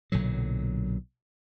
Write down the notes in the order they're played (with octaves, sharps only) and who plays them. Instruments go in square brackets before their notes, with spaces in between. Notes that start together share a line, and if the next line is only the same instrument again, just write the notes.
[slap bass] B1 A#2 D3 F#3